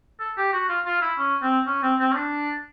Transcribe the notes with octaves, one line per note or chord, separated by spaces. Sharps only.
A4
G4
F#4
F4
F4
E4
C#4
C4
C#4
C4
C4
C#4
D4